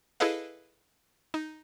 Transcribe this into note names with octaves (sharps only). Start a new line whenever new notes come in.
E4 G#4 A4 B4 D#5 F5
D#4